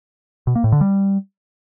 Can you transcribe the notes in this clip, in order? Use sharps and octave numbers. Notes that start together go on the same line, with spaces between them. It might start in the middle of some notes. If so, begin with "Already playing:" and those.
B2
A#3
A2
D3
G3